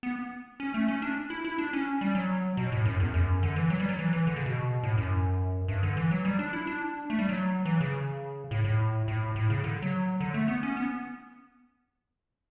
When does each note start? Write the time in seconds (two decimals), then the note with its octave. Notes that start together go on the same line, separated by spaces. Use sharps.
0.03 B3
0.60 C#4
0.74 A3
0.88 C#4
1.02 D4
1.30 E4
1.45 E4
1.58 D4
1.73 C#4
2.01 G3
2.15 F#3
2.57 B2
2.72 A2
2.85 F#2
3.00 E2
3.14 F#2
3.43 D3
3.56 E3
3.70 F#3
3.80 G3
3.89 F#3
3.99 E3
4.13 E3
4.27 D3
4.36 C#3
4.46 B2
4.83 A2
4.98 F#2
5.68 G2
5.83 D3
5.97 E3
6.11 F#3
6.25 G3
6.39 D4
6.53 E4
6.67 D4
7.10 A3
7.19 G3
7.29 F#3
7.65 E3
7.81 C#3
8.51 A2
8.65 A2
9.08 A2
9.36 A2
9.50 C#3
9.64 D3
9.82 F#3
10.21 D3
10.34 A3
10.48 B3
10.63 C#4
10.77 B3